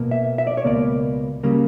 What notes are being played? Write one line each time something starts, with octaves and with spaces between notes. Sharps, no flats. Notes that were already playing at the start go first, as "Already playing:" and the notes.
Already playing: B2 A#3
E5
E5
D5
C#5
C#2 B2 A#3 D5
C#3 G3 A#3